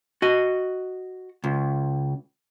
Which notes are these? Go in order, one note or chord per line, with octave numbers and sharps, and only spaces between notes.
F#4 D#5
C#2